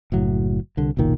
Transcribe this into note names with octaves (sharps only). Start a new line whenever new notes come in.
F#1 A2 F#3
C2 D3
F#1 B1 A#2 D#3